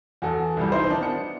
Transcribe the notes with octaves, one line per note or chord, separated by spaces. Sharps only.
E2 F#4 A4
C2 E3 G3
D#4 E4 C5
D#3 E3 D4 D#4
B3 C#7